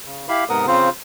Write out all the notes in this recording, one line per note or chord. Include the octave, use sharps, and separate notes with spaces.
C#3
E4 G4 F5 B5
G#2 C3 B3 A#4 F#5 D#6
C#3 C4 F4 C5